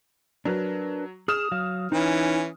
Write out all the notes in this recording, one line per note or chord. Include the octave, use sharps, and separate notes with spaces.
F#3 D4 A#4 B4
G#4 D#6 F6 E7
F#3 F5
E3 C#4 D#4